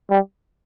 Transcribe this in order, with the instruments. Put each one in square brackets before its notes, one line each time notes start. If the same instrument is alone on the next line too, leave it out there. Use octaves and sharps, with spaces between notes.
[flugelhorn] G3